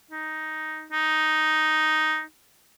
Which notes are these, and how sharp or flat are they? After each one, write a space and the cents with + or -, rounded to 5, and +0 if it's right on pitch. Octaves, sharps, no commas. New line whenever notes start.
D#4 +5
D#4 +0